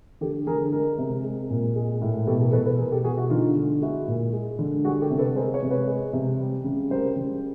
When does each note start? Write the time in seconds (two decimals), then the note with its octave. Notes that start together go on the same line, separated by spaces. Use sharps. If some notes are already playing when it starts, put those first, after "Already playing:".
0.21 D3 G4 A4
0.47 D3 G#4 A#4
0.72 G#3 G#4 A#4
0.98 C3
1.24 G#3
1.50 A#2
1.76 G#3
2.02 A2
2.27 B2 G4 A4
2.40 G#4 A#4
2.53 B2 A4 B4
2.66 A4 B4
2.78 B2 G#4 A#4
2.92 G4 A4
3.04 B2 F#4 G#4
3.17 E4 F#4
3.30 D3 D#4 F4
3.56 D3
3.82 G#3 E4 F#4
4.08 A#2
4.33 G#3
4.59 D3
4.85 G3 F#4 G#4
5.01 G4 A4
5.10 C3
5.19 A4 B4
5.36 G#3 A#4 C5
5.53 B4 C#5
5.63 C3
5.71 B4 C#5
5.87 G#3
6.13 C3
6.39 G3
6.64 C#3
6.90 G3 A#4 C5
7.16 C#3